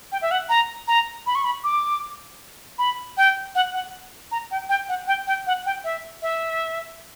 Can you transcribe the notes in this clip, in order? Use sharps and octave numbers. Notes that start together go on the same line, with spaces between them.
G5
E5
F#5
A#5
A#5
B5
C#6
B5
D6
B5
G5
F#5
F#5
A#5
G5
G5
F#5
G5
G5
F#5
G5
E5
E5